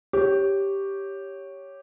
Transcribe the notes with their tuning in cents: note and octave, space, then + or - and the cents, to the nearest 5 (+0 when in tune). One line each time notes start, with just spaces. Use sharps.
G4 +0 C#5 +0